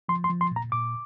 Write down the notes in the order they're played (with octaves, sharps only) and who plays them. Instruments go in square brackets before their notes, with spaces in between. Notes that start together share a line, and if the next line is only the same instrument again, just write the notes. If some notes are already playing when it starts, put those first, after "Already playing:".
[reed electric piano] F3 C6
C6
F3
C6
A#2
A#5
A#2 D6